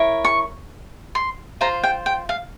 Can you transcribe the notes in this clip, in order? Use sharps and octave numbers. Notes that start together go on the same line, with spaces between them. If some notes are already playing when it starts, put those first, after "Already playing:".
Already playing: E4 A#4 C#5
C#6
C6
F4 C5 A#5
G5
G5
F5